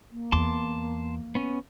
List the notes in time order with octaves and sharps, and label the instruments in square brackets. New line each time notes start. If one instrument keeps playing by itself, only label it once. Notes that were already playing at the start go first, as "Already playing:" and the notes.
[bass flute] A#3
[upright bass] E2 [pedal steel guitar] A5 C6 D6
[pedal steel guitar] B3 C#4